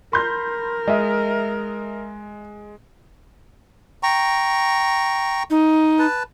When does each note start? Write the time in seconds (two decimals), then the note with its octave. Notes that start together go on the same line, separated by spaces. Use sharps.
0.13 A#4 B5 C6 G6
0.87 G#3 D#5 E5
4.03 G5 A#5 C#6
5.50 D#4
5.99 B4 A5